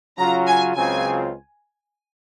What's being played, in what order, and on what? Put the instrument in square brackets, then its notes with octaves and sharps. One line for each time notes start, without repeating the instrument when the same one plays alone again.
[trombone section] C#3 F#3 C#4 F4 [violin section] A#5
[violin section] G#5
[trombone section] C#2 C#3 F#3 C4 F4 [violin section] G#5